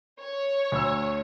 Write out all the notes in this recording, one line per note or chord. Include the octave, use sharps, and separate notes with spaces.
C#5
D2 E6